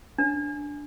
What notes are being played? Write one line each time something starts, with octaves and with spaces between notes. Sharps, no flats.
D4